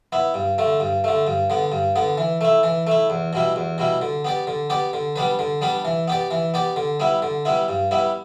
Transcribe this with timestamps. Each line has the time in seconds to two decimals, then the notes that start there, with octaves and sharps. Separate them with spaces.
0.12 B3 E4
0.34 G2
0.58 D3 A3
0.80 G2
1.04 D3 A3
1.27 G2
1.50 D3 B3
1.72 G2
1.96 D3 B3
2.18 E3
2.41 A3 E4
2.63 E3
2.87 A3 E4
3.10 E2
3.33 B2 G3 E4
3.56 E2
3.78 B2 G3 E4
4.02 D3
4.25 B3 G4 D5
4.47 D3
4.70 B3 G4 D5
4.93 D3
5.16 G3 B3 D4 B4
5.39 D3
5.61 G3 B3 D4 B4
5.85 E3
6.08 B3 G4 D5
6.31 E3
6.54 B3 G4 D5
6.76 D3
7.00 G3 B3 E4
7.22 D3
7.45 G3 B3 E4
7.68 G2
7.91 G3 B3 E4